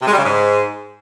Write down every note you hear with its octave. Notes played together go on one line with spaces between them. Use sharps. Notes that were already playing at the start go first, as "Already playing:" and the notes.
C3
G#3
G3
C#3
G#2